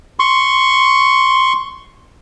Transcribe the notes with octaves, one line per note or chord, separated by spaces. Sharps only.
C6 C#6